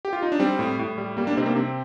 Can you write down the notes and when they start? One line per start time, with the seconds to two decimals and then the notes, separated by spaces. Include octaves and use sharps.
0.05 G4
0.13 F4
0.22 D#4
0.32 D4
0.40 G3 C4
0.59 A2
0.79 A2
0.98 G3
1.17 G3 A#3
1.27 A#3 D4
1.37 C3 C4 D#4
1.46 A#3 D4
1.56 C3 C4